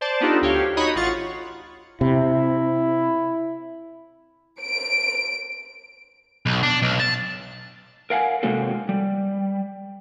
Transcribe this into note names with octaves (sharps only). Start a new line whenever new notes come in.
C5 D5 A5
B3 D4 D#4 F4 G4 A4
D2 G4 C#5 F5
D#4 F#4 C#5 D#5 B5 D#6
A1 F4 F#5 C#6 A6
C3 E4
D7
B1
D4
B1
A5
A#4 F5 F#5 G#5
C3 G#3 A#3 C4 F#4 A4
G3